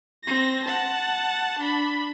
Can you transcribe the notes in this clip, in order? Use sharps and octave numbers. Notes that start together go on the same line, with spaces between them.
C4 A#6
F#5 A5
D4 B5